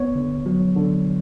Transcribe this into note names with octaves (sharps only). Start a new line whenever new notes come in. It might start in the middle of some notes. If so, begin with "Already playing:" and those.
Already playing: B3 C#5
D3
F#3
D3